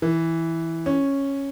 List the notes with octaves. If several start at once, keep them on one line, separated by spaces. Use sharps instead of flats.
E3
C#4